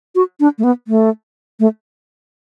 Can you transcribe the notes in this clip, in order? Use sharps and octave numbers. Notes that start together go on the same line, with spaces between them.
F#4
D4
A3
B3
A3
A3